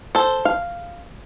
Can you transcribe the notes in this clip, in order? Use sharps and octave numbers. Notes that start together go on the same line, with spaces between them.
A4 C5
F5